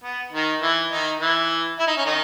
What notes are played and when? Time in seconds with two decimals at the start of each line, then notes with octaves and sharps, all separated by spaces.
0.03 B3
0.32 D#3 D#4
0.62 E3 E4
0.91 D#3 D#4
1.20 E3 E4
1.79 E4
1.87 D#4
1.97 C#4
2.06 D#3 D#4